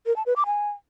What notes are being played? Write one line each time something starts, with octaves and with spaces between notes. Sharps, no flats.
A#4
A5
B4
D6
G#5